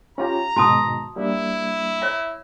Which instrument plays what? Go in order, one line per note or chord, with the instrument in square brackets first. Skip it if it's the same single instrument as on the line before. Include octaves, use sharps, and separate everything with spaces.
[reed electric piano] C#4 F4 G4 [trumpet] A#5
[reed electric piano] G#2 B2 D#3 [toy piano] F#4 A5 D#6
[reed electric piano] G3 A#3 D4 [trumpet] E4
[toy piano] C#5 E5